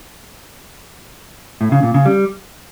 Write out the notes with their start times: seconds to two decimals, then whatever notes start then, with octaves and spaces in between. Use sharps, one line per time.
1.61 A2
1.72 C#3
1.83 A#2
1.94 C#3
2.06 G3